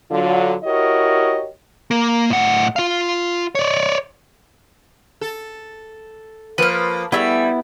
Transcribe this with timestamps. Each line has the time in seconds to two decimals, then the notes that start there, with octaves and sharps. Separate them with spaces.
0.11 D3 F#3 F4
0.64 E4 F#4 G4 A#4 C#5 D#5
1.91 A#3
2.30 A2 F#5
2.76 F4 F5
3.55 C#5 D5
5.21 A4
6.58 F3 A#3 B4 F6
7.12 G3 A3 B3 E4 G#4 E5